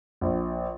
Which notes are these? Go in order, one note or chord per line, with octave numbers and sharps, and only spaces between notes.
A#1